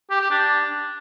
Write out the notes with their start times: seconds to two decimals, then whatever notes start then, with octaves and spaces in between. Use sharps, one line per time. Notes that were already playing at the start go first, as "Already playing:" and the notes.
0.10 G4
0.20 G4
0.30 D4